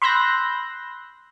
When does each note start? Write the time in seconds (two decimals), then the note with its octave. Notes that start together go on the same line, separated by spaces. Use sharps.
0.02 B5 C6 E6 F#6 G6 A#6